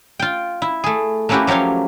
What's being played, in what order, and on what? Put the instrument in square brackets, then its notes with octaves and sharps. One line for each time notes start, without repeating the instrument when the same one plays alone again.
[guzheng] F4 G5
E4
A3 G#4
A3 A#3 C#4 E4 F#4 G4
F3 F#3 G4 C#5 F5